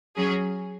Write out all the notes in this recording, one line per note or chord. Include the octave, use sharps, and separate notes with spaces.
F#3 C#4 G#4